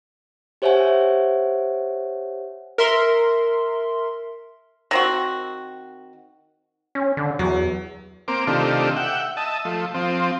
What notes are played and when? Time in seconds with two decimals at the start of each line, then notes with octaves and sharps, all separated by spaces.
0.62 G4 C5 C#5 E5 F#5 G#5
2.78 A#4 E5 C6
4.91 D#3 C4 F#4
6.95 C#4
7.17 D3
7.39 E2 F#3
8.28 A#3 C4 D6
8.47 C3 D#3 A3 D4 F4 G4
8.96 E5 F#5 G5
9.37 D#5 E5 A5
9.65 F3 A3
9.94 F3 C4